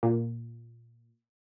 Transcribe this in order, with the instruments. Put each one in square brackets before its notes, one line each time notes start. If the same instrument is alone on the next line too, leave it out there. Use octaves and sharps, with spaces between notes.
[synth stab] A#2